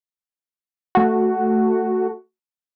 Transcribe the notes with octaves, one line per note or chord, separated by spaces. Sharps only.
A3 F#4